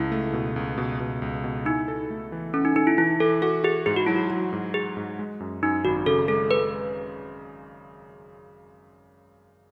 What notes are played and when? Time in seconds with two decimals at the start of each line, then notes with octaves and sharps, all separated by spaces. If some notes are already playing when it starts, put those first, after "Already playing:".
Already playing: C#2 E4
0.12 A3
0.33 B2
0.56 C#2
0.78 B2
1.00 B2
1.22 C#2
1.44 B2
1.65 D#4 E4
1.88 A4
2.10 A3
2.32 E3
2.53 C#4 A4
2.65 D#4
2.76 D#4 A4
2.87 E4
2.98 E3 E4
3.20 E3 A4
3.42 F#4 A4
3.64 F#4 G#4
3.86 G#2 G#4
3.96 F#4
4.07 F#3 E4
4.16 F#4
4.30 F#3
4.53 G#2
4.74 F#4 G#4
4.97 G#2
5.19 G#3
5.40 F#2
5.63 F#2 D#4
5.85 G#1 F#4
6.06 C#3 A4
6.28 G#3 A4
6.51 G#3 B4